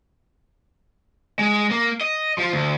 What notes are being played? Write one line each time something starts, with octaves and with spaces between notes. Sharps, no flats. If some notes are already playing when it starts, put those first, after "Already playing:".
G#3
A#3
D#5
F3 F4
D2